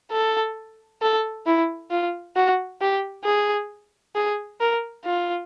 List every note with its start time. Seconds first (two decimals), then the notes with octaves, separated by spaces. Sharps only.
0.12 A4
1.02 A4
1.46 E4
1.91 F4
2.36 F#4
2.81 G4
3.25 G#4
4.15 G#4
4.60 A#4
5.05 F4